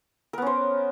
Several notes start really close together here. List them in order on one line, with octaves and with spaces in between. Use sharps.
A#4 B3 C#4 C5